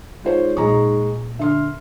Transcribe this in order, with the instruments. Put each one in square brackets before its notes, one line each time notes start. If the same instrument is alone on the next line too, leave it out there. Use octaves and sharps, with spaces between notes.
[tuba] G#2 [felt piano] F4 C5 C#5
[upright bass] A#2 [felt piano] G#3 A#5 C#6
[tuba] D3 [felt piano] E5 C6 F6